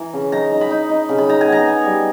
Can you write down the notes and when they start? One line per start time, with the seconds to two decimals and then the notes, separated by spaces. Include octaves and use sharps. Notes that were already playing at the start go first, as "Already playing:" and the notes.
Already playing: E3 A#5
0.13 C#3
0.32 D#4 A#5
0.51 D#4
0.61 B5
0.71 D#4
0.89 D#4
1.09 C#3
1.18 B5
1.28 D#4 A#5
1.41 G#5
1.47 B3
1.52 A#5
1.66 B3
1.85 G3